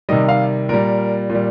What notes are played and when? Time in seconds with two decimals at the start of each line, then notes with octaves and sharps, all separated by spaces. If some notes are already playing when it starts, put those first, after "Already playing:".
0.09 C3 D#3 G3 D#5
0.29 F5
0.69 A#2 G3 A#4
1.30 A#2
1.35 G3